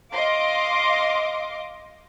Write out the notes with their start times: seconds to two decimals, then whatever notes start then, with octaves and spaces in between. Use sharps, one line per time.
0.12 D#5 F5 C6 D6